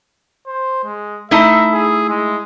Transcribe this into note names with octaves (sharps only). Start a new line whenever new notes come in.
C5
G#3
A3 D#4 E4 E5
G#4
G#3